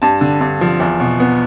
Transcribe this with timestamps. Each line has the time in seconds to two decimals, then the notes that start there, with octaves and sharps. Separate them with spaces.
0.02 G2 A5
0.21 D3
0.41 G2
0.61 F3
0.80 E2
1.00 B2
1.20 B3